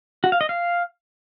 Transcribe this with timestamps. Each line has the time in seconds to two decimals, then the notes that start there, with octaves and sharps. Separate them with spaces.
0.24 F#4
0.32 F5
0.41 D#5
0.49 F5